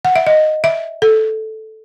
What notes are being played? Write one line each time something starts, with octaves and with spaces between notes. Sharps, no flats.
F#5
E5
D#5
E5
A4